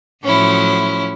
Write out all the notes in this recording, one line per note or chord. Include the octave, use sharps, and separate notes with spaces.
A2 F3 F#3 C#4 E4